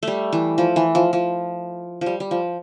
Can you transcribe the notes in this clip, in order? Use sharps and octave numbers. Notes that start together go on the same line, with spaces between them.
G3 A3
E3
F3
E3
F3
F3
F3
G3
G3
F3